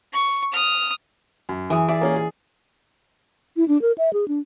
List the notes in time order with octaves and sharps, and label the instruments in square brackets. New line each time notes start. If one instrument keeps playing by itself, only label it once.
[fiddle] C#6
D#6 F6
[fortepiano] F#2
[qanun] E3 G#4
[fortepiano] G#4 E5 [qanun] D5
[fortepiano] A#3 C#4 G#4
G#4
[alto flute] E4
D4
A#4
E5
G#4
D4